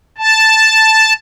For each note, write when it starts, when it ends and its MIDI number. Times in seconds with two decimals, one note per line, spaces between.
0.18 1.13 81